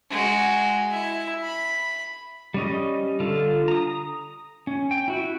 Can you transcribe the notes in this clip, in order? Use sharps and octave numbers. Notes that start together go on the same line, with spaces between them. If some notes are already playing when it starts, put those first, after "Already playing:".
G#3 F#4
E4 E5
B5
G3 C#4 D#5
D3 F4 A4
A#5 D#6
C#4
G5
E4 F#4